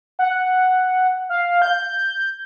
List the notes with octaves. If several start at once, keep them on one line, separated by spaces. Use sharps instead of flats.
F#5
F5
G6